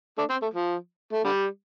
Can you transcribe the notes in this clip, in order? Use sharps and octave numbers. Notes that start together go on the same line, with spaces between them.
A3 D4
C4
A3
F3
A3
D3 G3